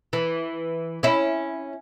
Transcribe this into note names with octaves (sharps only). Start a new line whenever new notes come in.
E3
C#4 E4